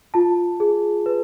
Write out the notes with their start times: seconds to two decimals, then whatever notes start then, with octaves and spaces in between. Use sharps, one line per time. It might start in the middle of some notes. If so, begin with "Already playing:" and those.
0.14 F4 A5
0.60 G#4
1.06 B4